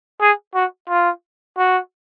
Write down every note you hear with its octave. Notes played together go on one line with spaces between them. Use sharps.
G#4
F#4
F4
F#4